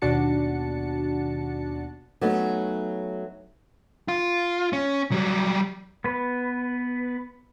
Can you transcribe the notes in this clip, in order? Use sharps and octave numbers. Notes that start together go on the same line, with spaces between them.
D#2 B2 D4 F#4 A5 C#7
F#3 A3 B3 C#4 D#4
F4
C#4
F#3 G3
B3 B4